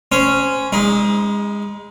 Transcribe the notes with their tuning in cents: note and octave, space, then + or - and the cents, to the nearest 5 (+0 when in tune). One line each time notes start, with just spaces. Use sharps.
C#4 +0 C5 -10
G#3 -25 D#4 +30